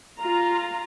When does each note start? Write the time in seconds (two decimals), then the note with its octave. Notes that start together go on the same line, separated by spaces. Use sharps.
0.20 F4 A#5